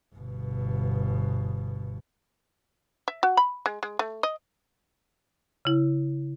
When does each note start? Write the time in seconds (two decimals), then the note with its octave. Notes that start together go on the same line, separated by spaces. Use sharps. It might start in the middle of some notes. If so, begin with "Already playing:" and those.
0.15 G1 B2
3.08 E5
3.23 F#4
3.37 B5
3.66 G#3
3.83 G#3
3.99 A3
4.23 D#5
5.65 C#3 E4